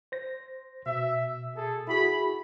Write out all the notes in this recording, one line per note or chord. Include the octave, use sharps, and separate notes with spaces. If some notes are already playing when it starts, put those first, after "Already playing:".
C5 A#6
B2 E5
G#4 A4
E4 F#4 G#4 B5